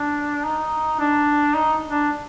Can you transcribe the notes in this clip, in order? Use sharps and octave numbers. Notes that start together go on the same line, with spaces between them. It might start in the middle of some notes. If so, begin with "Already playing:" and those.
Already playing: D4
D#4
D4
D#4
D4